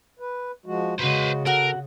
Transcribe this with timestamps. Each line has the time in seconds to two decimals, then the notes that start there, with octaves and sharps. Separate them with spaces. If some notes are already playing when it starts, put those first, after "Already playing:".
0.19 B4
0.66 F3 G#3 F#4
0.99 C#3 G#3 F#4 B4 C5
1.46 F#4 A4 A#4 F#5